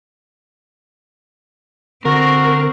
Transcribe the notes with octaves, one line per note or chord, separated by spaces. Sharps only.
D3 C4 F#4 A#4